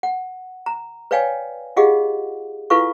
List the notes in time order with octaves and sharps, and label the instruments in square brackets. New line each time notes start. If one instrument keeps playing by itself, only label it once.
[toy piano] F#5
A#5
B4 C#5 D5 F5 G5 G#5
F4 G4 G#4 D#5 F5 F#5
E4 F4 A4 B4 F5 C#6